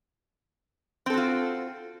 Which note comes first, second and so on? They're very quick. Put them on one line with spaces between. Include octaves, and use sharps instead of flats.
C4 A4 F#4 F4